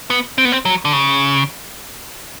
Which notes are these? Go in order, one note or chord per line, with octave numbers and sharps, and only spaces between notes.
B3
C4
B3
C4
F#3
D3
C#3